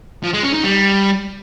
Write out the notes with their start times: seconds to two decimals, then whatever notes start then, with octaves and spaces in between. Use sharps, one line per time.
0.24 F3
0.34 G#3
0.44 C#4
0.54 D#4
0.64 G3